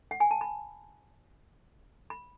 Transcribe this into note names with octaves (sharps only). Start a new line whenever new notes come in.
F#5
G#5
A5
B5
B5